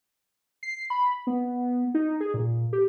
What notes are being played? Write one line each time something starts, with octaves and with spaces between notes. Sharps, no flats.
C7
B5
B3
D#4
G#4
A#2
G4